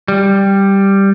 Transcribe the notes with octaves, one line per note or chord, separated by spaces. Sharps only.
G3